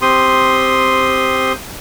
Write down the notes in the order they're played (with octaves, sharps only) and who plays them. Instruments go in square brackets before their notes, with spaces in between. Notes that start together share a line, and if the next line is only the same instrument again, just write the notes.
[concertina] C4 G4 C6 D#6